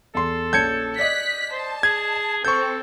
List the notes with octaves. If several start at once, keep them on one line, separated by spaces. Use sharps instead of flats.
E2 A4 C6
A#1 C#4 A5 G6 G#6 C#7
D5 D#5 F#6 B6
C5 A5
G#4 G#6
C4 A4 C#6 G6